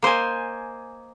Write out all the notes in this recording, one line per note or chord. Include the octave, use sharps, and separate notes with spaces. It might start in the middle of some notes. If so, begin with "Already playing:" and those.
A#3 C5 D#5 G#5